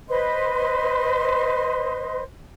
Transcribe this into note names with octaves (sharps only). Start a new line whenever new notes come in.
B4 C5 D#5 C6